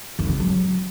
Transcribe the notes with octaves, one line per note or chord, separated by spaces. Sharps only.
D#3
C#3
F#3